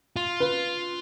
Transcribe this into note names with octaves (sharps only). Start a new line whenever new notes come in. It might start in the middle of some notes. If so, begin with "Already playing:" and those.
F4
B4